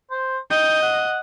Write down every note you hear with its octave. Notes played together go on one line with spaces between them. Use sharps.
C5
D#5 G5
F#5